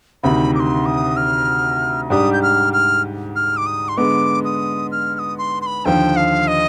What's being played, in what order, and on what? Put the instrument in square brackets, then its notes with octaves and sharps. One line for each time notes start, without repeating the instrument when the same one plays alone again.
[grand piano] D2 C3 D#3 [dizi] B5
[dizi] D6
C6
D#6
F6
[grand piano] G#2 G3 D4 G4 [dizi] D#6
[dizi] G6
F6
F6
F6
D6
D#6
C6
[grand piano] D3 G#3 B3 [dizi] D6
[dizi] D#6
F6
F6
D#6
C6
C6
B5
[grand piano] D#2 D3 F3 [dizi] G5
[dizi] F5
D#5